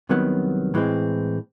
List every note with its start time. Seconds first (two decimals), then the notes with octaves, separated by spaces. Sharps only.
0.09 C2 C3 D#3 F#3 B3
0.74 A2 E3 G#3 C4